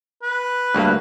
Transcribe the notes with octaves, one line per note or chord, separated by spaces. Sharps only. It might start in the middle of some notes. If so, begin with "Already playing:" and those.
B4
D2 G2 A#3